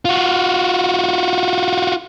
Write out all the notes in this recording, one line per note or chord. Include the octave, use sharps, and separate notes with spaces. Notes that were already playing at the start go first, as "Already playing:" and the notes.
F4 F#4